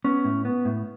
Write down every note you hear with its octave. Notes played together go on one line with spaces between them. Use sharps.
B3 C#4
A2
B3
A2